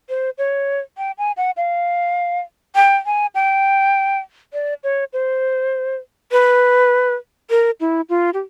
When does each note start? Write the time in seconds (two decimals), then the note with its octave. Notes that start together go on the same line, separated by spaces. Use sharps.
0.09 C5
0.38 C#5
0.98 G5
1.18 G#5
1.37 F#5
1.57 F5
2.75 G5
3.06 G#5
3.35 G5
4.53 D5
4.84 C#5
5.13 C5
6.32 B4
7.50 A#4
7.80 E4
8.09 F4
8.34 G4